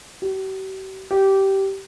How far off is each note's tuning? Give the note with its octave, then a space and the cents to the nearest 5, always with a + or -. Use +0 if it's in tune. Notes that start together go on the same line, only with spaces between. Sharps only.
G4 -45
G4 -15